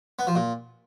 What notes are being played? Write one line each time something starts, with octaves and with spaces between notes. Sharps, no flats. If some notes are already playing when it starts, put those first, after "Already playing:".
B3
F3
A#2